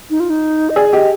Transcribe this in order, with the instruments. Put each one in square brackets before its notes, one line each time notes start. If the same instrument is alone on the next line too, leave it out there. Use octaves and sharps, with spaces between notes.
[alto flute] D#4
F4
D#4
D#5
[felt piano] G#4 [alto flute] D5
[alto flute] D5
[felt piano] G4 [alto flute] D#5